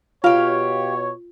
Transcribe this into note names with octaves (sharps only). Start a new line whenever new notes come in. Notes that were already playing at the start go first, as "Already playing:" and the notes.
B2 F4 G4 C#5 F5